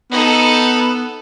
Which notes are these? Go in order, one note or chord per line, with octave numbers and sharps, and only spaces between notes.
B3 D#4 A4